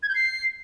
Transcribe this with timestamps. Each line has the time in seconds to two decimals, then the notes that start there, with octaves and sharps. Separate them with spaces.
0.03 G#6
0.09 G6
0.15 C7